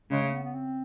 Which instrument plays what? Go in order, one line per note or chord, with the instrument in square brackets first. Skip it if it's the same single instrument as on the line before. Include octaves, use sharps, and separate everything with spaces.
[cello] C#3 [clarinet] G#3
[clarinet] A3
B3
B3
C4